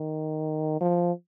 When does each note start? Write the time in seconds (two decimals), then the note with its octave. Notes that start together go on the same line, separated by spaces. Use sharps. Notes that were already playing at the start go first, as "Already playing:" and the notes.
Already playing: D#3
0.81 F3